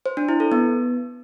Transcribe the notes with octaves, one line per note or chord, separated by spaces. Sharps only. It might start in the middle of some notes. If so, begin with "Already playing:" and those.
C5
D4
E4
A4
B3